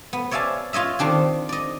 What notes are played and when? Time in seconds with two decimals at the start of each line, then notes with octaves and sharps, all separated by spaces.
0.13 B3
0.31 C#5 D5 E5 F5 G#5 A5
0.73 F4 C#5 D#5 E5
0.99 D#3 C4 D4 G4
1.49 D5 D#5